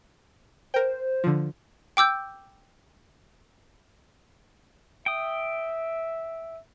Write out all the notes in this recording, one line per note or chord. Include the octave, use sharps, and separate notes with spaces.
A#4 C5 G5
D3 F3
G5 D6 E6 G6
E5 G5 D#6